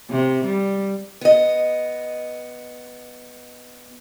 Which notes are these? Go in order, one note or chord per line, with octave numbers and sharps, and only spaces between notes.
C3
G3
B3 D#5